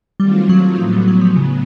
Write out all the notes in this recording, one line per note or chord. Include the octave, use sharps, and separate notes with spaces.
D#3 F#3 G3 A3 C4 F4
F#3
A2 F3 F#3 B3
G3
F#3
F3
C#3